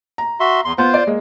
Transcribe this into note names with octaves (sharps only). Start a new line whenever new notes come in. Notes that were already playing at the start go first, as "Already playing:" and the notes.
A#5
F#4 E5 C6
E2 C6
B3 F4 C5
D5
G#3 A#3